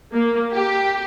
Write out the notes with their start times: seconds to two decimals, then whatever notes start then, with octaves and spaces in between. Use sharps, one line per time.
0.13 A#3
0.53 G4